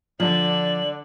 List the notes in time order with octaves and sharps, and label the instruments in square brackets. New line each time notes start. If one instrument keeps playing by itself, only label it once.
[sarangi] D3 [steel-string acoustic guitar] F3 [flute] D5 [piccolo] F#7